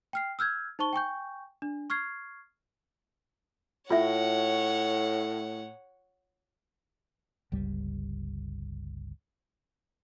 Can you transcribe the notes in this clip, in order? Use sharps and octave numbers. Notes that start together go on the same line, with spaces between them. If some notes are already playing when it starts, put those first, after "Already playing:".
G5 F6 C7
E6 F6 G6 G#6
D#4 C5 A5 C#6 G7
G5 G#5 C#6 G6
D4
C#6 F6 G#6 C7
A2 F4 C#5 E5 F#5
G1 C#2 G3